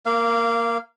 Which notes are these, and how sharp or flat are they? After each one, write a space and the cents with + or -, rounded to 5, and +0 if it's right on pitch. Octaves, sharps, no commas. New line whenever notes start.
A#3 +0 F5 -25